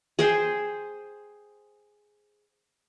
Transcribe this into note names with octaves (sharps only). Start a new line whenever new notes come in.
G#4 C5 G5 G#5